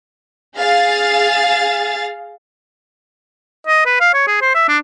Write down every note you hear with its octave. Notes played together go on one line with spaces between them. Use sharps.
G#4 F5 A6
D#5
B4
F5
C#5
G#4
C5
E5
D4